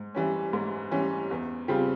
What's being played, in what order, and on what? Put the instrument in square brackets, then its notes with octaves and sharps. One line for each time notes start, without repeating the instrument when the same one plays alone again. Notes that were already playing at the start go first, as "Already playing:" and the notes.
Already playing: [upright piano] G#2
E3 G3 C#4
G#2
E3 G3 C#4
E2
C#3 G3 C4 F4